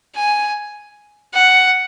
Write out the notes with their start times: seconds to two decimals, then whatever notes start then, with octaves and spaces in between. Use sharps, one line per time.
0.16 G#5
1.34 F#5